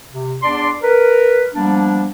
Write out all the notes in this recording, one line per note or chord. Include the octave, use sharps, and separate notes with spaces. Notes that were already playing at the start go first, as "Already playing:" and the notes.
C3
E2 D4 D5 C6
A#4 B4
F3 G3 A#3 B3 D4